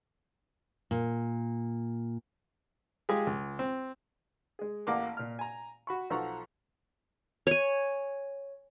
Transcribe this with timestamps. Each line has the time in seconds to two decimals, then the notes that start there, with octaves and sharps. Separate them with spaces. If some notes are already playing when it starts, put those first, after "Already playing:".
0.91 A#2
3.09 G#3 F4 G4 G#4
3.27 C#2
3.59 C4
4.59 G#3 G#4
4.87 A1 A#3 F#5 D6
5.17 A#2 F6
5.39 G#5 A#5
5.87 F#4 B5 C#6
6.10 B1 F3 A4 F#5 A#5 C#6
7.47 C#5 G#5